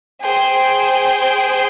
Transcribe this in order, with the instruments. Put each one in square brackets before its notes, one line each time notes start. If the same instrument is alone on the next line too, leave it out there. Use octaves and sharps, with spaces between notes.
[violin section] G#4 C5 G5